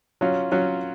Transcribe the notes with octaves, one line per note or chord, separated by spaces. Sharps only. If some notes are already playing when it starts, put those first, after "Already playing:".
F#3 C#4 F4
F#3 C#4 F4